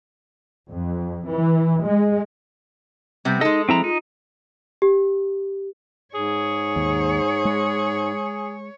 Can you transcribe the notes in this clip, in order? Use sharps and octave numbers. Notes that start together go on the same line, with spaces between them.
F2
E3
G#3
C3 G3 B3 C4
G#3 D#4 A4 D#5
F3 C4 E4 A#5
D#4 F4
G4
G#2 G#4 C#5
D#2
G#3